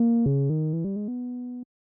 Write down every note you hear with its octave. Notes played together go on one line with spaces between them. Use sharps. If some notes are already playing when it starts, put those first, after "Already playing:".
Already playing: A#3
C#3
D#3
E3
G3
G#3
B3